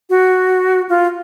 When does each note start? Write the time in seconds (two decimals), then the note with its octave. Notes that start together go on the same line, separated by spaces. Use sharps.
0.10 F#4
0.89 F4